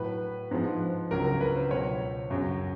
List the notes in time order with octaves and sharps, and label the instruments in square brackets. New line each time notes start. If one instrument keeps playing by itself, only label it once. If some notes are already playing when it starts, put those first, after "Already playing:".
Already playing: [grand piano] A2 F#3 B4
G#2 F3
C#2 C#3 F#3 A#4
A#4
B4
C5
C#2 B2 F#3 C#5
F#2 C#3 F#3